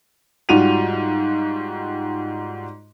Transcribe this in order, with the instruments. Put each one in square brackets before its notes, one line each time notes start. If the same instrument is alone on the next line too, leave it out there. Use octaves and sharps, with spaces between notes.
[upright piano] G#2 G3 F4 F#4 D#7 F7